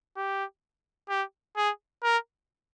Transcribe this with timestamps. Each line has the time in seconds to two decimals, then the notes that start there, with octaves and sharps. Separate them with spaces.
0.17 G4
1.10 G4
1.57 G#4
2.03 A#4